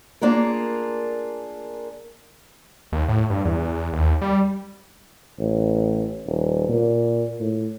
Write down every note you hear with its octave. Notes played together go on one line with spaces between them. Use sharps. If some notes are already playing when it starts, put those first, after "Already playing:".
A#3 D4 F4 G#4 A#4
D#2
A2
G2
E2
E2
D#2
G3
A1
D#1
A#2
A2